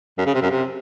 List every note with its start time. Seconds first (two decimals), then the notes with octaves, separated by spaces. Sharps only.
0.18 F#2
0.26 C#3
0.34 C3
0.42 F#2
0.50 C3